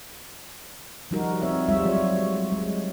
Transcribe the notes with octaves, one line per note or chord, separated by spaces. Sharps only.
F3 G3 D#4 F#4 A#4
C4 C#5 E5
G3 G#3 F4 E5
F#3 C#5
G#3